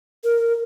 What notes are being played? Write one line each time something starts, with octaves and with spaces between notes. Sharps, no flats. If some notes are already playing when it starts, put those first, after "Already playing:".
A#4